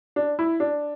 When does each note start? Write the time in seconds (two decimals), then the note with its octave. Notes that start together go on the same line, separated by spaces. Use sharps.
0.16 D4
0.39 E4
0.60 D4